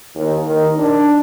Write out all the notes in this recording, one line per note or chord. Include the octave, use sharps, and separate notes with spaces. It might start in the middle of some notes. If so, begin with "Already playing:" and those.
D#2
D#3
D4